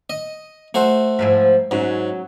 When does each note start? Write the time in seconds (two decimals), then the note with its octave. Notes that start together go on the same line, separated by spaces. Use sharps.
0.10 D#5
0.74 A3 F#4 C5
1.19 G#2 F3 E4
1.71 G#2 F#3 C#4